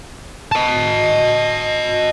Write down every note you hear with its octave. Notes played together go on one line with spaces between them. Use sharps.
D#5 A5